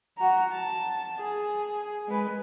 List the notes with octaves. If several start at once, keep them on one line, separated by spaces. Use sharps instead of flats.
F#4 A#5
A5
G#4
G#3 B4